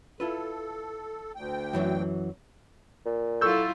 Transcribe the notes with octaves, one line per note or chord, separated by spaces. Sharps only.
E4 F4 A4 B4
D2 G5
F#2 E3 F#3
A#2
F#3 E4 F4 A4 C#6 E6 G6